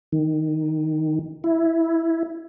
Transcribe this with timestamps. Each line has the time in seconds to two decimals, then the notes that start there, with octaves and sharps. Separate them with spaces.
0.12 D#3
1.44 E4